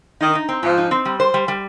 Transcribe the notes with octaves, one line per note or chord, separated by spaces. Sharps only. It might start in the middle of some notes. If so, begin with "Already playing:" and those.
D#3 D#4
D#4
C4
G#2 F3
D#4
C4
G3
C5
G3
G3